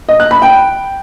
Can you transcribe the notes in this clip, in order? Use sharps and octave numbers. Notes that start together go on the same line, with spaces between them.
D#5
F#6
B5
G5